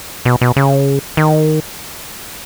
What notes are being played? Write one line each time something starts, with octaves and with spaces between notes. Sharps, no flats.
B2
B2
C#3
D#3